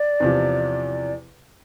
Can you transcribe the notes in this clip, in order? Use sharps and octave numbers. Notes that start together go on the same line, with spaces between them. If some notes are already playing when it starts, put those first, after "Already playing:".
Already playing: D5
E2 C3 F3